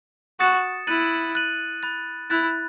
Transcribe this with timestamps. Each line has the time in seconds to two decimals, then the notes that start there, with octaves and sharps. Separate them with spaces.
0.40 F#4 D#6 A6 C#7 E7
0.87 E4 F#6 A6 D#7 F#7
1.35 F#6 A6 D#7 F#7
1.83 B5 F#6 A6
2.30 E4 B5 F#6 A6